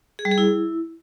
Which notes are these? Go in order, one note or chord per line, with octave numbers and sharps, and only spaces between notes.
G#4
G3
G#4
E4